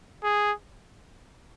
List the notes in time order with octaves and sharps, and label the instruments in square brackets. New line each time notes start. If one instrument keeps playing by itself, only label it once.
[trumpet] G#4